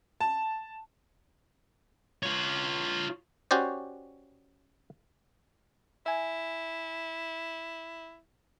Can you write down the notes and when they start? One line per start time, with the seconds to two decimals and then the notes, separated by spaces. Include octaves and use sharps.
0.20 A5
2.23 F4 C#5
3.51 C#4 F#4 G4 C5 D5
6.06 E4 E5 G#5